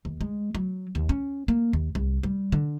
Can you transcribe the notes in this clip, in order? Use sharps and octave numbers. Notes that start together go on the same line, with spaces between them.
D#2
G#3
F#3
D#2
C#4
A#3
D#2
C2
G3
D3